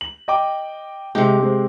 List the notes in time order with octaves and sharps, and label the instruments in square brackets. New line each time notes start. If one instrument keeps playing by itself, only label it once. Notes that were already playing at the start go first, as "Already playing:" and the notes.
[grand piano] F#7
D#5 G5 D6
[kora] C3 G4 [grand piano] G#3 D#4
[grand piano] G#3 C4